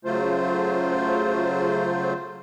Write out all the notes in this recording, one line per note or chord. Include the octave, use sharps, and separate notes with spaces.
C#3 F#3 A3 F4 C5